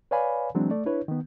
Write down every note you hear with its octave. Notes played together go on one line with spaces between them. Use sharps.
B4 C#5 D5 F5 G#5 B5
E3 F#3 G#3 C4 D4
A3 D5
D4 E4 B4 C#5
D#3 B3